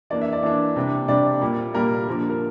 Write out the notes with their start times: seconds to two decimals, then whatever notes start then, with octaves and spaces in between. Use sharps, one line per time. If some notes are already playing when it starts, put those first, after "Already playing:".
0.10 E3 A#3 D4 D5
0.21 E5
0.32 D5
0.43 E3 A#3 D4 D5
0.76 C3 G3 D4
1.08 C3 G3 D4 D5
1.41 A#2 G3 A#3
1.74 A#2 G3 A#3 A#4
2.07 D3 F3 A#3
2.29 A#4